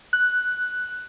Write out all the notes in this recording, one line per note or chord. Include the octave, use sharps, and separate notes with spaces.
F#6